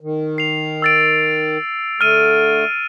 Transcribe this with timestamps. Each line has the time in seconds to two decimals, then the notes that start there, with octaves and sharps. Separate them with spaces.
0.01 D#3
0.38 C7 F7
0.82 E6 A6 D7
2.01 D3 A3 F6 D#7